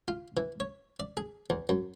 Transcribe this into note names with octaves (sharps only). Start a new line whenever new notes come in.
F4
E3
C#5
D5
G#4
E2
F#2